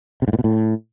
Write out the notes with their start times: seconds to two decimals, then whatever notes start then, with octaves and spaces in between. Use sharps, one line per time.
0.22 C3
0.28 G#2
0.33 A2
0.39 B2
0.44 A2